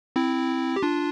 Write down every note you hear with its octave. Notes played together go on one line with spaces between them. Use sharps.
C4 E4
G4
D4 F4